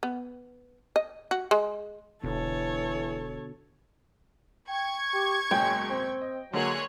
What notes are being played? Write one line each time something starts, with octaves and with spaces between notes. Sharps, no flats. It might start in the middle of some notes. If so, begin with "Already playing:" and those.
B3
D#5
F#4
G#3
E1 B2 D3 E3 A4 C#5
G5 C#6 G#6
G4
F#1 G#2 B2 C#4 G5
C4
D#5
D3 F#3 G#3 A#3 G#4 C#5 F#6